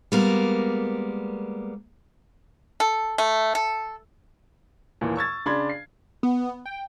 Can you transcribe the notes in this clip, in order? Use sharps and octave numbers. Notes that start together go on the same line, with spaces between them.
G3 G#3 A#3 B3 A#4
A4
A3
A4
D#2 A#2 E3
C#6 E6 G#6 A6
C#3 D4 B5 C6 G#6
C7
B3
G5